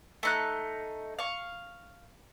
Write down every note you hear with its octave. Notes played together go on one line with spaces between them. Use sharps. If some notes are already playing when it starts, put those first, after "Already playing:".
A3 D#4 F#6
F5 C#6